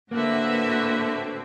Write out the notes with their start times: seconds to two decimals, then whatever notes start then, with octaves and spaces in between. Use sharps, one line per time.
0.11 A2 D3 A#3 C4 F#4 B4 E5